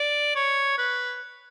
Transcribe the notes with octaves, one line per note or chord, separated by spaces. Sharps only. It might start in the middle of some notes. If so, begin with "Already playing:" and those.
Already playing: D5
C#5
B4